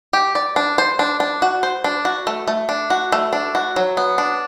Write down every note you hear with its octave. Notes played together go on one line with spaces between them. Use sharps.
G4
D5
D4
C5
D4
D4
F#4
C5
D4
F#4
A3
A3
D4
F#4
A3
D4
F#4
F#3
B3
D4